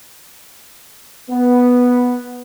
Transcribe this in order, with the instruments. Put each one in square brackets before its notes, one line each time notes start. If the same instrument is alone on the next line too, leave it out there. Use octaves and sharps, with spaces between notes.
[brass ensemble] B3